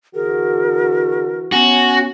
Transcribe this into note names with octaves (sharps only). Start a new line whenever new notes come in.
D3 E3 F#4 G#4 A#4
B3 C#4 F#4 G#5